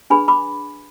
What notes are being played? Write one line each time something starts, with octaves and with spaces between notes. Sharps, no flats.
D4 G#4 B4 G#5 B5
B5 D6